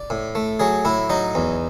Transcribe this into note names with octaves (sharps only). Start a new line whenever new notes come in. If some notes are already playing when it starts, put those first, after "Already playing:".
Already playing: D5
A2
A3
F#3 G#4
A2 E4
F#3 D#4
E2